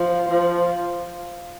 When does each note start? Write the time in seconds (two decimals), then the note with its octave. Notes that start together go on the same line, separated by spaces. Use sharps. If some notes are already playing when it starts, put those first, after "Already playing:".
Already playing: F3
0.30 F3